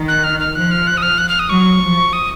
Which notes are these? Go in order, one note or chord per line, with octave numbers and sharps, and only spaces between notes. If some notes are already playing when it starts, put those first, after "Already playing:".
Already playing: D#3
F#6
F6
F6
F3 F#6
F6
F#6
D#6
F6
F#6
F6
D#6
F#3 C#6
F3
D#6